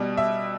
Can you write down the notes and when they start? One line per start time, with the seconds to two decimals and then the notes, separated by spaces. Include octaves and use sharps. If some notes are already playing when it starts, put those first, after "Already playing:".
Already playing: B2 G3
0.17 E5